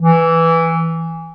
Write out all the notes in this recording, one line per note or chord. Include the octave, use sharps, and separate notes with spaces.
E3